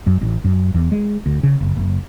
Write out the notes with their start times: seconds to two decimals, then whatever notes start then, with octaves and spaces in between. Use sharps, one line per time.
0.07 F#2
0.22 A1
0.44 F#2
0.74 E2
0.92 G#3
1.26 D2
1.43 C#3
1.61 F#1
1.77 F#1